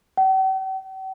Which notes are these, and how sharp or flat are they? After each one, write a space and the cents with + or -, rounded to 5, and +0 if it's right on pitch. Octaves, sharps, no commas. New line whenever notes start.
G5 -45